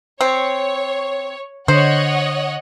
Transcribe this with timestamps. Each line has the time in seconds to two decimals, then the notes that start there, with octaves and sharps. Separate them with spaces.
0.21 C4 C#5
1.68 D3 C5 C#5 D#5 F#5